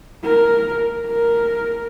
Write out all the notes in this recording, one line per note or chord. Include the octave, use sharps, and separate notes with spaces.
A#4
A#4